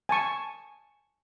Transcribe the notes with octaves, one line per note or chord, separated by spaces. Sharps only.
G#5 A5 C#6